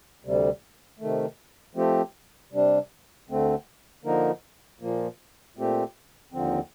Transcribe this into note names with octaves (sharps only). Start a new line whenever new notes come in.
D2 C3 G3
C3 D#3 A3
F3 A3 C4 G4
C3 G3 D4
D2 D3 A3 C4
D3 F3 A#3 D#4 A#4
A#2 F3 A#3
A#2 A3 C4 G4
D#2 D3 F3 C4